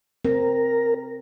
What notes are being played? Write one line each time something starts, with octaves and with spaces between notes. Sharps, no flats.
C4 A#4